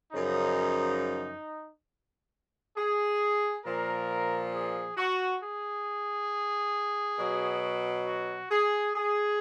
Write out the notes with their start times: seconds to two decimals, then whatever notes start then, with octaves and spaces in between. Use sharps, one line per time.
0.12 F#2 C#3 F3 D#4
2.77 G#4
3.65 A#2 F3 A#4
4.53 G#4
4.97 F#4
5.42 G#4
7.18 B2 F#3
8.06 F#4
8.50 G#4
8.95 G#4